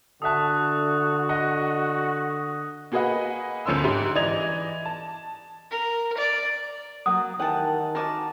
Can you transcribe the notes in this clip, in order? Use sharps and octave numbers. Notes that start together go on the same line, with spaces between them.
D3 F#4 A4 E5 A5 D#6 F#6
D#5 F#5
A#3 F#4 G#4 B4 D#5 F#5
G1 D2 F3 C#4 C6 E6
G#2 G#3 G4
E3 D5 D#5 G#6 F7
A5
A#4
D5
F#3 A#3 D#6
D#3 E3 G4 F#5 G#5 A5
F#4 A#4 G#5 A5 D6